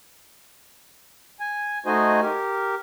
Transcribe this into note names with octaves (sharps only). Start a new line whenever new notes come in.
G#5
A3 D#4 F#4 C5 D#5 G#5
G4 A#4